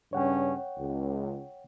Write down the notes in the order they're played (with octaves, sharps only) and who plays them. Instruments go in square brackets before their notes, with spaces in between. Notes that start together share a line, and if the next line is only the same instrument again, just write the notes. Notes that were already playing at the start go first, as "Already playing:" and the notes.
[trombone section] G2 C#3 C#4 [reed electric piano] C#5 F#5 G5
[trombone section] C#2